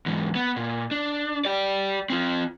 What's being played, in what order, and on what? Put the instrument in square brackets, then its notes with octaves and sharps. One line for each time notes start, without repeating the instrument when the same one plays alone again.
[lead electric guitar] E2 G#2
B3
A#2
D4
G4 D5
C4 F4